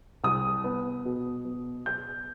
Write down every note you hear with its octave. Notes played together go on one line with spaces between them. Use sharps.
C2 D#6
B3
B2
B2
B3 G6